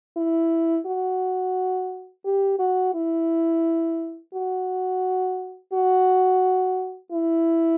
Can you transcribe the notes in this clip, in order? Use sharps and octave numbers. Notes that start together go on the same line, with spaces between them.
E4
F#4
G4
F#4
E4
F#4
F#4
E4